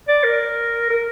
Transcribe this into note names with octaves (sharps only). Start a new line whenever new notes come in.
D5
A#4
A#4